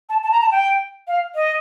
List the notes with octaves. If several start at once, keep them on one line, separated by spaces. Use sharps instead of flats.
A5
A5
A#5
A5
G5
F5
D#5